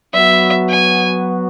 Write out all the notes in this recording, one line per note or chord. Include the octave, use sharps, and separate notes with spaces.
F#3 B3 F#4 E5
G#5